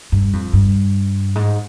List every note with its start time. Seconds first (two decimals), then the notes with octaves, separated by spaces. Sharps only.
0.12 G2
0.33 F2
0.53 G2
1.35 G#2